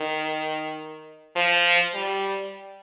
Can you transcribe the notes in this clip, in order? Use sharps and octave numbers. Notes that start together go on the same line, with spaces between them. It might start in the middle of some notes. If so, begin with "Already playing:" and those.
Already playing: D#3
F3
G3